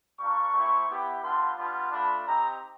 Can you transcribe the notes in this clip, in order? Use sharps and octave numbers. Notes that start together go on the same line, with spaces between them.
G3 A#3 D4 F4 C#6
A3 C4 E4
B3 E4 G4
G3 B3 D4 F4 C6
G3 B3 D4 F4
A3 D4 F4 B5
C4 D#4 G4 A#5